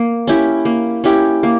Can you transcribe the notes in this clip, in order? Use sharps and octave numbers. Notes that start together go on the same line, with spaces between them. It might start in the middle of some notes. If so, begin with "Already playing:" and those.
Already playing: A#3
C#4 E4 G4
A#3
C#4 E4 G4
A#3